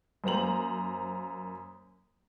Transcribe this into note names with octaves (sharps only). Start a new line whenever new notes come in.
F#2 A#3 C5 A#5 F#7